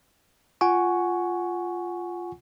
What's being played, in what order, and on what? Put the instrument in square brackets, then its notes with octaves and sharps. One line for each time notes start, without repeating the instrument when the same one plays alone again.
[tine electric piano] F4 F#5 G#5 C#6